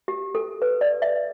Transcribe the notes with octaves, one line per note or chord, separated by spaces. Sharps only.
G4
A4
B4
D5
E5